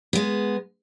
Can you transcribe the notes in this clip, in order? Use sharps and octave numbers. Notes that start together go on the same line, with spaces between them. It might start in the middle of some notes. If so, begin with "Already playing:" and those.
G#3 B3